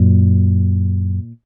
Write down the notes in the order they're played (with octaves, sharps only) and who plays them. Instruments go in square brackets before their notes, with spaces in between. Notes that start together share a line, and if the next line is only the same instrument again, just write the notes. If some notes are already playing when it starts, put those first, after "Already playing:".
Already playing: [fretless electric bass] F#2 A#2